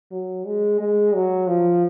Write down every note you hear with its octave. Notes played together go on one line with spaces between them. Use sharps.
F#3
G#3
G#3
F#3
F3